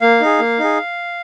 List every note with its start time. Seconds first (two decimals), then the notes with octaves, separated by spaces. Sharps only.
0.01 A#3 F5
0.21 D#4 G#4
0.39 A#3
0.59 D#4 G#4